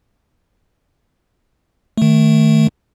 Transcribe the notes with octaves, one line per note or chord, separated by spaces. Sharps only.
D#3 A3